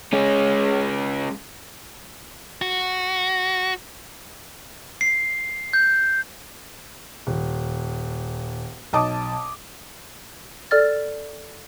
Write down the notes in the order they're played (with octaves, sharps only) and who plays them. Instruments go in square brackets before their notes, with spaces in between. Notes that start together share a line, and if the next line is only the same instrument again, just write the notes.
[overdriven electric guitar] G#3 C#4
[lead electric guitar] F#4
[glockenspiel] C7
G6
[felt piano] D#1
B1 D#5 A5 D6 D#6
[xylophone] A4 D5 F6 A6